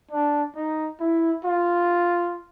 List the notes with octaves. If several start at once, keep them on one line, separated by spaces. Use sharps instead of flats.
D4
D#4
E4
F4